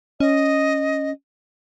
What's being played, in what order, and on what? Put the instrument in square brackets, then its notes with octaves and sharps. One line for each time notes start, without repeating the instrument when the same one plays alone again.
[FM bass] C#4 [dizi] D#5